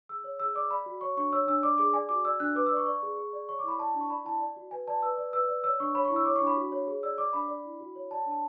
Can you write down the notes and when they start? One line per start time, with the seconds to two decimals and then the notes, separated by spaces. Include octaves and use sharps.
0.09 G#4 E6
0.24 C#5
0.40 G#4 E6
0.55 D5 D6
0.71 D5 B5
0.86 F#4
1.01 C#5 C#6
1.17 D4 C#6
1.32 C#5 E6
1.47 D4 E6
1.63 D5 D6
1.78 G#4 D6
1.94 D5 G#5
2.09 F#4 D6
2.25 D5 E6
2.40 D4 F#6
2.55 B4 D6
2.66 E6
2.72 D5 C#6
2.86 D5 C#6
3.03 G#4
3.17 G#4
3.33 D5
3.49 C#5 C#6
3.59 D6
3.64 E4 B5
3.78 D5 A5
3.95 D4
4.01 C#6
4.10 D5 B5
4.25 E4 A5
4.40 D5
4.56 F#4
4.71 B4 G#5
4.88 D5 A5
5.03 B4 E6
5.18 D5
5.33 B4 E6
5.49 D5
5.64 C#5 E6
5.80 D4 C#6
5.95 C#5 B5
6.05 C#6
6.10 E4
6.16 E6
6.25 C#5 D6
6.36 C#6
6.41 D4
6.47 B5
6.56 F#4
6.72 C#5
6.88 G#4
7.03 D5 E6
7.18 D5 D6
7.33 D4 B5
7.49 D5
7.65 E4
7.80 F#4
7.96 C#5
8.11 D5 A5
8.26 D4
8.31 A5